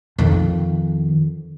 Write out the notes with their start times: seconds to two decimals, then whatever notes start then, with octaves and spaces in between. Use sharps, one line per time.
0.18 F2 D#3